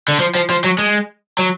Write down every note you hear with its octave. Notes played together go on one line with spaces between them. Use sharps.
D3
F3
F3
F3
F#3
G#3
F#3